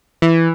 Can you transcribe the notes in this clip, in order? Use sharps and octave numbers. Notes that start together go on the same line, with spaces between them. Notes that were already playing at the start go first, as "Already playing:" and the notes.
E3